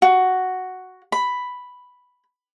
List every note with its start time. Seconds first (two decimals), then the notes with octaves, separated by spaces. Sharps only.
0.02 F#4
1.12 B5